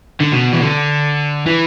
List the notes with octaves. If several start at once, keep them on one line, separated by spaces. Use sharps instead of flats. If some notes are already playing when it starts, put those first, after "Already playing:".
D3
B2
E3
D3
E3